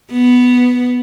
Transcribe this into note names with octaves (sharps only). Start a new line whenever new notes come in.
B3